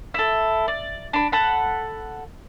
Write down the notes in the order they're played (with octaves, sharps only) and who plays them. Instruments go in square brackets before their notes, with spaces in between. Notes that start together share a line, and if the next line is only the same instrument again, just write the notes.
[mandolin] E4 A4
D5
D4 B5
A4 F#5 B5